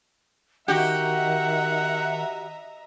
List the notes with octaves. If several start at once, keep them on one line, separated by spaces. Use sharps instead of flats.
D#3 F#4 G4 D#5 E5 F#5 A#5